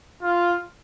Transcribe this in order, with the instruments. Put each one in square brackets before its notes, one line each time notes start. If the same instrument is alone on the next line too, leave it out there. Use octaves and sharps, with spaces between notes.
[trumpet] F4